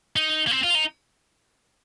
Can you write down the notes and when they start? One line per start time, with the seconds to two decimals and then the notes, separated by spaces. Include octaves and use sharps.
0.16 D#4
0.47 A#3
0.51 C4
0.64 F4
0.75 D#4